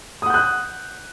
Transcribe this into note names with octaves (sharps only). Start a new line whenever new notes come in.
F#5 D#6 F#6 G6